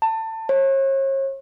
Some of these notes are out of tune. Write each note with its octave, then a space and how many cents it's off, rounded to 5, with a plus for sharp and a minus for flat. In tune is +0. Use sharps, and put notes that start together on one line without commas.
A5 +25
C#5 -40